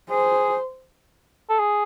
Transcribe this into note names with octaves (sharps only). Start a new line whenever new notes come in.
G#4 C5
A4
G#4